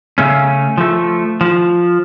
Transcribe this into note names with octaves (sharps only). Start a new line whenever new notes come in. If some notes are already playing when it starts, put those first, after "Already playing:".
C#3 A3 C#4
F3 A3
F3